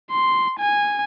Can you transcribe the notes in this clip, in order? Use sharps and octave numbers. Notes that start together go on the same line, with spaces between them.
C6
G#5